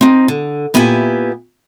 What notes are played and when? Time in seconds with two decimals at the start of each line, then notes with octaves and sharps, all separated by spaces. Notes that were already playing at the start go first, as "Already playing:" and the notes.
0.01 C4 D#4
0.28 D3
0.74 A#2 B3 E4 G4 G#5